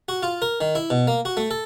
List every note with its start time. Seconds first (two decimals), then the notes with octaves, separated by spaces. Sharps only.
0.09 F#4
0.23 F4
0.42 A#4
0.61 D#3
0.75 E4
0.90 B2
1.08 A#3
1.25 F#4
1.37 A3
1.51 A4